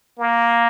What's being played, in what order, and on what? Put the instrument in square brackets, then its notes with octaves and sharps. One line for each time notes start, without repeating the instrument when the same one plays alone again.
[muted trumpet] A#3